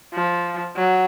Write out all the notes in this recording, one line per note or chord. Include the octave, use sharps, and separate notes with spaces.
F3
F#3